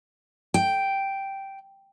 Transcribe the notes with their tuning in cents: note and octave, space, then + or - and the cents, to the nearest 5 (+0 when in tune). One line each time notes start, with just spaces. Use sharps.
G5 -5